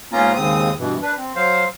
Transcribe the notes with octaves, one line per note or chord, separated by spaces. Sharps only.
G#2 A#3 B3 C#4 F4 A#5
D#2 G#2 C#3 C4 D#6
G2 B2 E3
D4 B4
C4
F#3 C5 F5